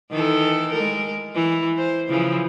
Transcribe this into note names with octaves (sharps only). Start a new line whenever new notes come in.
D#3 E3 A4
G#3 A#4
E3
C5
C#3 E3 F3